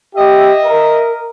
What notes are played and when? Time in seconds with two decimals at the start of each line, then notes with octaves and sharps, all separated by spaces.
0.15 G4 D#5 E5
0.65 A#4